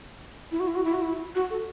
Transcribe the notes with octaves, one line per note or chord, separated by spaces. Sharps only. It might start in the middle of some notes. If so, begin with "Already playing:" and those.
E4
F#4
E4
F#4
E4
F#4
E4
F#4
A4